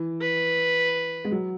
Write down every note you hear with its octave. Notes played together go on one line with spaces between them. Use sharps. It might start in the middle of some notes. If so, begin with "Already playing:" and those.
Already playing: E3
B4
G#3
F#3